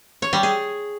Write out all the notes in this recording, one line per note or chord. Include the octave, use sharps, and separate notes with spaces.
C#5
G3
G#4